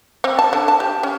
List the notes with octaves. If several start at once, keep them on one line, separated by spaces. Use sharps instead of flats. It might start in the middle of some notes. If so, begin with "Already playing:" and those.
C4
A5
D3
A5
G4
C#4